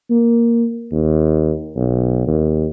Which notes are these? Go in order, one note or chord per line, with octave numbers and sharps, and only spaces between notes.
A#3
D#2
B1
D#2